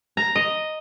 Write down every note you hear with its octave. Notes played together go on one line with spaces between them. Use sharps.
A#5
D#5